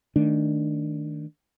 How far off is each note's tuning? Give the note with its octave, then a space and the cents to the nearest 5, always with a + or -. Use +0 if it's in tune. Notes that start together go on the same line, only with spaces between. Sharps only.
D#3 +0 A3 +0 D4 +0